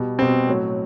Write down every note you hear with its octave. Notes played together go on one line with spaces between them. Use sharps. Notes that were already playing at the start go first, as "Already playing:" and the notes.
Already playing: B2 G3
B2 G3 C4
A2 F#3